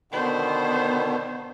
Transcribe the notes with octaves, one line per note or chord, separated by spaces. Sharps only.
B2 D3 D#3 B3 C5